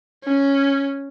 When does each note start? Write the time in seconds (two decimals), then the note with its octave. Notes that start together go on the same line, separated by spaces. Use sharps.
0.24 C#4